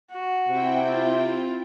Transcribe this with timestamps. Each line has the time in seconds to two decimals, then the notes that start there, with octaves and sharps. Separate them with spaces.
0.11 F#4
0.49 C3 C4 E4 G5
0.89 F4